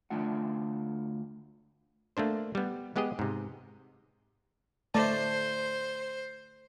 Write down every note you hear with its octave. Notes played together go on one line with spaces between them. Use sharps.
D2 A3 D4 F4 F#5
A3 A#3 D4 C5
G3 B3
G#3 B3 G4 G#4 D#5
G#2 C3
A3 C5 D5 A5